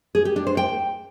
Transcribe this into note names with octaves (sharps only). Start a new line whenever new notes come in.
G#4
G4
D4
C5
G5